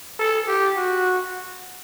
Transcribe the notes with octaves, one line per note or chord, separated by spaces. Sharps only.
A4
G4
F#4